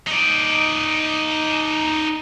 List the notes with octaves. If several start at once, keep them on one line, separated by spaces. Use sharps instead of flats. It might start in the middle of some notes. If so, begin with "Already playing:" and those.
D#4 D5